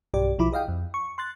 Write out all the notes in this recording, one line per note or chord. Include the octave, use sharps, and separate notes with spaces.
B1 G2 G4 D5
B1 F3 E4 B5 D6
G#4 D#5 F5 G5
F2
C#6
C6 F#6 A6